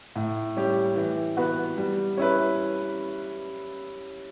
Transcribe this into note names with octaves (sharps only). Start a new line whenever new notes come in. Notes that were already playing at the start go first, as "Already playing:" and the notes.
A2
G3 C#4 G4
E3
B3 F#4 B4
G3
C#4 E4 B4